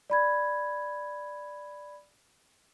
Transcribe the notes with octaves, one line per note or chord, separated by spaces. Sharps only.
D5 B5 G#6